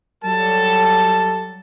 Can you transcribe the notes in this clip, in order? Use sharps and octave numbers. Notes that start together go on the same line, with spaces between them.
F#3 G3 A4 A5